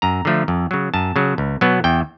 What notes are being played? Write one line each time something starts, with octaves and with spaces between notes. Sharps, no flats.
F#2 A#5
D3 F3 A3
F2
C#3 F#3
F#2 A5
C#3 F#3
C#2
B2 F#3 B3
E2 G5